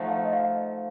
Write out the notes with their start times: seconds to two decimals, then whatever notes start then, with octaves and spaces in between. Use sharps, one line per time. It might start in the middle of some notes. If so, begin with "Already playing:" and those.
Already playing: F3 A3 D#4 F#4
0.08 F5
0.25 D#5
0.33 F5